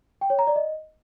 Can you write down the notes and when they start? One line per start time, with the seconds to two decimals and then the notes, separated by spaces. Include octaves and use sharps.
0.21 G5
0.30 C#5
0.39 A#5
0.47 D5
0.56 D#5